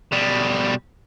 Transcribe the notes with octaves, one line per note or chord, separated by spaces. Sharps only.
B2 G3